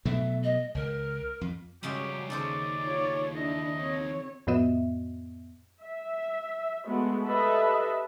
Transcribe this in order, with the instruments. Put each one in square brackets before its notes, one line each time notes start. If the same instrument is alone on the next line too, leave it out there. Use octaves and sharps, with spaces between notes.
[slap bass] B2 F#3 A3 [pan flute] E5
[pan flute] D#5
[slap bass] C#2 [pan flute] A#4
[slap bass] F2
[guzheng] F#2 C#3 G#3 [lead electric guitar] G3 F#4 [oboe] G4
[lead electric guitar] D#2 D#4 [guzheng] C#3 A4 C5 [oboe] D5
[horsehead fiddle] F4 C#5
[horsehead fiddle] D4 E4 [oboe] D#5
[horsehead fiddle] C4 C#5
[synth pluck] F2 A2 B3 F#4 D#5 E5
[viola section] E5
G#3 A3 B3 F#4
G4 A4 B4 D#5 E5